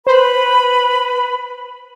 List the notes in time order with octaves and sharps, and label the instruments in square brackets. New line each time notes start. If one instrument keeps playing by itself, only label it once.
[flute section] B4 B5 [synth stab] C5